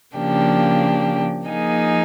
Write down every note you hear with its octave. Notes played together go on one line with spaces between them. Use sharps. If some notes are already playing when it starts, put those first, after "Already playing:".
C#3 F3 A#3 D4 G4
F3 A#3 D#4 G#4